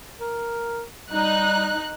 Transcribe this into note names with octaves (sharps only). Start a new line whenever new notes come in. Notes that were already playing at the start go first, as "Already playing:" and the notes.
A#4
G3 D#4 F#6